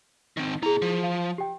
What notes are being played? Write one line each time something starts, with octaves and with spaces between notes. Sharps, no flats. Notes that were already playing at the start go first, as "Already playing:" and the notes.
D#3 C4
B2 E4 G#4 A#5
F3
F5
G4 G5